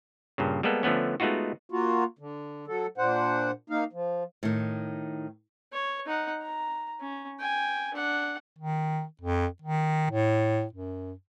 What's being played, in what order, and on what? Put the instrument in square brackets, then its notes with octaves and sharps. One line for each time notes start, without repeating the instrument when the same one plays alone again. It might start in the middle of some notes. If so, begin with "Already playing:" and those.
[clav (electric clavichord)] G2 A#2 C#3
G3 G#3 A#3 B3 A4
D3 F3 A3 B3 C#4
G#3 A3 B3 D#4 F4 F#4
[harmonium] A#3 F4 F#4
D3
F#3 A4
A#2 D4 C5 F#5
A#3 D#4 F5
F3
[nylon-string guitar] A2 D#3
[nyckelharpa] C#5
D#4 F#5
A#5
C#4
G5 G#5
D4 F#5
[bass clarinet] D#3
F2
D#3
A2
F#2